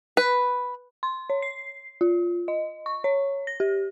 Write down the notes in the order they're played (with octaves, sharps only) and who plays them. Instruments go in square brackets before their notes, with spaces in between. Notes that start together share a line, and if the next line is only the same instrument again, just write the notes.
[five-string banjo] B4
[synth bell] C6
C#5
C7
F4
D#5
C#6
C#5
A#6
G4